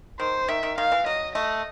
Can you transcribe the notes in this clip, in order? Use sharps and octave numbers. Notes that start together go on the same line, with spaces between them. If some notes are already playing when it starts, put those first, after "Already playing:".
D#3 C5
D#3 E5
D#3
D#3 F5
E3
F#3 D#5
A3 D#5